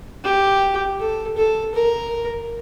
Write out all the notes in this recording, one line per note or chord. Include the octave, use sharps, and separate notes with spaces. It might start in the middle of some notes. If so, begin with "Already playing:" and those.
G4
A4
A4
A#4